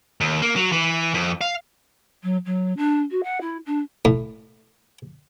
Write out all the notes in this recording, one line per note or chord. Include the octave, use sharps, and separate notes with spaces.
D#2
A#3
F#3
E3
F2
F5
F#3
F#3
D4
F#4
F#5
E4
D4
A2